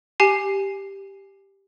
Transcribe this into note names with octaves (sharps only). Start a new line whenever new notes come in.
G4 G#5 C7